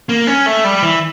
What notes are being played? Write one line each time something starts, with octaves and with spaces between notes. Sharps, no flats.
A#3
C#4
A3
G3
E3